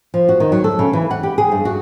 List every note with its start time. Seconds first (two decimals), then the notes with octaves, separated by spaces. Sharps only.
0.14 F3
0.29 F#4
0.40 D#3
0.52 F#3
0.64 A4
0.79 C#3
0.93 E3
1.11 F#5
1.23 G4
1.38 G#4
1.52 G2
1.65 F#4